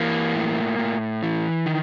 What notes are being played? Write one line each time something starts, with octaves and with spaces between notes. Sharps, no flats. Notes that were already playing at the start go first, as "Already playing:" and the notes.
Already playing: E3 A#3
A2
A2
E3
D#3